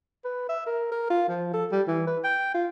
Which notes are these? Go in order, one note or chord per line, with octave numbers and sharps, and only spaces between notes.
B4
E5
A#4
A#4
F4
F3
A4
G3
E3
B4
G5
F4